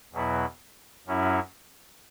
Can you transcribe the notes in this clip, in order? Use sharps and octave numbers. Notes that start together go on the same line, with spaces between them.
E2 B2 F#3 B3 E4
F#2 F#3 C#4 E4